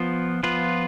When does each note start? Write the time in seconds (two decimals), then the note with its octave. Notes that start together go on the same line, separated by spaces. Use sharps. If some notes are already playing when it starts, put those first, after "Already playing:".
Already playing: F3 B3 F4
0.43 F3 B3 F4 B4